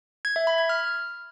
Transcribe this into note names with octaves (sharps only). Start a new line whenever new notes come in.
G#6
E5
B5
G#6
F6